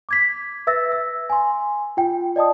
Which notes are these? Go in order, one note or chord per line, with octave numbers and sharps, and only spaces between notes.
D6 G#6 B6
B4 E5 E6 A6 A#6
E6
G#5 C6
F4 G5
D5 D#5 A5 D#6